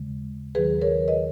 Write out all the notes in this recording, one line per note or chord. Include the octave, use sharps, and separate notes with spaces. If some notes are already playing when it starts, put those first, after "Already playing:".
Already playing: D#2 C#3 G#3
D#2 D#3 F#3 G#4 B4
A#4 C#5
B4 D#5